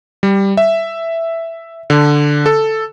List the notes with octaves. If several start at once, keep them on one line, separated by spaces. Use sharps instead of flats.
G3
E5
D3
A4